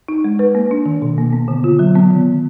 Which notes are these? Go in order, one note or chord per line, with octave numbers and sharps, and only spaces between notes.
D#4
G#3
B4
A#3
D4
D#3
B2
A#3
B3
D3
F4
F#3
B3
D#3